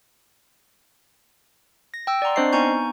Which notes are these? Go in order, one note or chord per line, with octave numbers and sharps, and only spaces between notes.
A#6
G5 E6
D5 F#5 A#5 C6
C4 D4 C5 D#5 C#6 C7
B3 D#4 G#5 A#5 C#6 G6